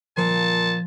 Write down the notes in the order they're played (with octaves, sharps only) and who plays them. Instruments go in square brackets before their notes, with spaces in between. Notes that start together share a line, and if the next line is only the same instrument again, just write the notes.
[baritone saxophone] A#2 [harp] F3 [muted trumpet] A5